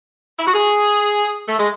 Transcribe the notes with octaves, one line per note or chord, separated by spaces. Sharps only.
E4
F#4
G#4
A3
G#3